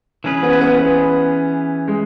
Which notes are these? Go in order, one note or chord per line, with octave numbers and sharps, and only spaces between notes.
E3 C#4 G#4 B4
B3
B3
B3
G#3